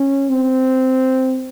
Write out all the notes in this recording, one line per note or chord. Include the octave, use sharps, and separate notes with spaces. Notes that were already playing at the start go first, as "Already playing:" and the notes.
Already playing: C#4
C4